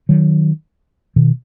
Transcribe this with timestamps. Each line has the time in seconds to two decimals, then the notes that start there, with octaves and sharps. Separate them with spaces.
0.09 D#3 F#3
1.16 B2 D#3